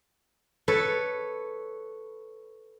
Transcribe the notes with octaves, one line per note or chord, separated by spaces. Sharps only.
A4 B4 C#5